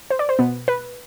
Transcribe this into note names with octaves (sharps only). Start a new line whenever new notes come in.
C5
D5
C5
B2 B3
B4